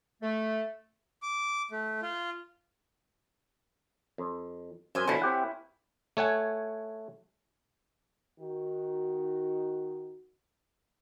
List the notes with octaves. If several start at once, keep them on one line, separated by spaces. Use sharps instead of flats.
A3
D6
A3
F4
F2
F#2 C5 G#5
B2 D3 F3 C#4 E4
C4 G4 F#5
A3 C#5 F#5 G#5
D#3 D#4 F#4